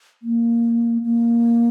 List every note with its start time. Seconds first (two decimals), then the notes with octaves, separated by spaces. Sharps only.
0.23 A#3
1.02 A#3